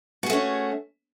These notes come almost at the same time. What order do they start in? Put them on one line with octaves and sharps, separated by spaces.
F#4 G#4 A3 C#4